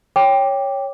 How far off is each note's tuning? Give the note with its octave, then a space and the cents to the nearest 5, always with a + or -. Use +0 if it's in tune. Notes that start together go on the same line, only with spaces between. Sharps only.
C#5 +0 G5 +10 D6 +0